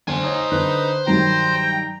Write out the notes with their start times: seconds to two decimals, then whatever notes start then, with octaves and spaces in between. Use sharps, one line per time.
0.08 D3 C5 G#5
0.24 D#4 C#5
0.52 D3 B4
1.07 G2 D#3 F#3 G5 A#5